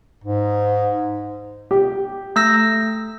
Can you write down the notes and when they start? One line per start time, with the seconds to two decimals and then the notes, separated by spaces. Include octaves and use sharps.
0.24 G#2
1.71 G4
2.36 A3 E6 A#6